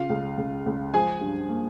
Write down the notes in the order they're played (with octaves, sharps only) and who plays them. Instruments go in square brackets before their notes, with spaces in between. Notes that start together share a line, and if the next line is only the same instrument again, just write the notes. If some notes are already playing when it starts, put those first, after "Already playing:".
Already playing: [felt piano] C#3 [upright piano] F4 F5
[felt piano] C#2
C#2
C#2
[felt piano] F3 [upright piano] G#4 G#5
[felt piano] G2
A#3